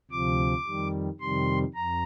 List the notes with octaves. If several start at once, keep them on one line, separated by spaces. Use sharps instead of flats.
D2 C3 F3 D6
F2 D#3 G3
F2 C3 D#3 G3 C6
F2 A#5